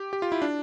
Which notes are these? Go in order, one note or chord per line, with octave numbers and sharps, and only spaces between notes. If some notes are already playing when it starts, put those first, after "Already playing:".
Already playing: G4
G4
F4
E4
D4